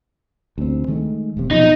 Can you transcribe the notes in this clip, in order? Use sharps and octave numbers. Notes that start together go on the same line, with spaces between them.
D2 A3 C4
D#3 G#3 A3
E1 B1 C3
B2 F3 F#3 D#4